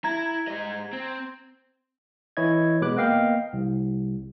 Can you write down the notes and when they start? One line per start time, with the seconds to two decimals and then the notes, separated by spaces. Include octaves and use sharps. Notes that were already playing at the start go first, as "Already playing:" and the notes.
0.04 E4 A#5 G#6
0.48 G#2 D#5
0.93 C4
2.37 E3 E4 C#5 D#5 G#6
2.81 B2 G#3 B4 D6 F#6
2.96 A#3 B3 D#5 F5 G5
3.53 C2